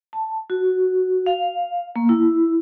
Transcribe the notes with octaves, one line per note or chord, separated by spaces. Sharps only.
A5
F#4
F5
A#3
E4